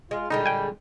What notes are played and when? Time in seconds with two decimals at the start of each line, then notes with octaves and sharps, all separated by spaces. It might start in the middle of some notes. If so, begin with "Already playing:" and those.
0.11 G#3 F4
0.30 A#2 D3 G3 G#3 D#4
0.46 G5 G#5